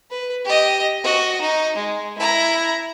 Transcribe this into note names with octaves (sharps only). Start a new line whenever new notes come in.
B4
G4 D#5
F#4 D#5
D#4
G#3
E4 A#5